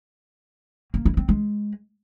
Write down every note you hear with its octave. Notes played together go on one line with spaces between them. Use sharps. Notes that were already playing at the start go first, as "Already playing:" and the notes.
A#3
E4
C4
G#3